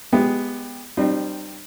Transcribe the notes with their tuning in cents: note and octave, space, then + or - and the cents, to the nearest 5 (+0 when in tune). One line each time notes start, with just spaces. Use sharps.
G#3 +0 B3 +0 G4 +15
G3 -10 C4 +0 D#4 -45